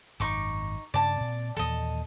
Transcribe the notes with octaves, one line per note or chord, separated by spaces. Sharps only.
G#1 F#2 D#4 C#6 D6
G2 C#3 D4 D5 A5
A#2 C4
D#2 A#2 E3 A4 D#5